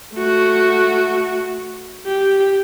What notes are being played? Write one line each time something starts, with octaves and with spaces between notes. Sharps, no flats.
A3 F#4
G4